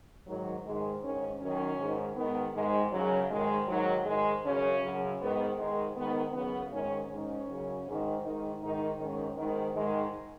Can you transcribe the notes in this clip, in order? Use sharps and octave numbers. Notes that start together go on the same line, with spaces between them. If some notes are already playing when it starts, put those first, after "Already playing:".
G#2 D#3 F#3
G#2 D#3 G#3
G#2 D#3 C#4
F#2 D#3 C#4
G#2 D#3
G#2 D#3 B3
G#2 D#3 G#3
F#2 C#3 F#3
G#2 D#3 G#3
G#2 D#3 F#3
G#2 D#3 G#3
F#2 C#3 C#4
F#2 C#3
G#2 D#3 B3
G#2 D#3 G#3
G#2 D#3 B3
F#2 C#3 B3
G#2 D#3 C#4
G#2 D#3 C#4
F#2 C#3
G#2 D#3
G#2 D#3 D#4
G#2 D#3 D#4
G#2 D#3 C#4
G#2 D#3 B3
G#2 D#3 G#3